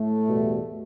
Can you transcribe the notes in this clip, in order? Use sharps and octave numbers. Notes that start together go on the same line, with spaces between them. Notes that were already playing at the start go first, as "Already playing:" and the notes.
Already playing: A2 A3
E2 B2 G3